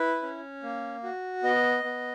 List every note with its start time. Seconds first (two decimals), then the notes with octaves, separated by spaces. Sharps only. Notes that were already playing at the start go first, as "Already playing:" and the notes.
Already playing: E4 B4
0.22 C#4
0.63 A#3
1.04 F#4
1.43 B3 D#5
1.84 B3